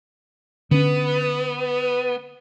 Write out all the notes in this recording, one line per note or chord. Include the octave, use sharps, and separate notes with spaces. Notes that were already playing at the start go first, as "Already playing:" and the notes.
D3 B3 C#4 B4